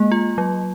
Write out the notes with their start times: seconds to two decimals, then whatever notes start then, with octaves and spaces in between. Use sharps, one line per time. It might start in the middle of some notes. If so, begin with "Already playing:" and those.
Already playing: G#3 A#3
0.12 F4
0.38 F#3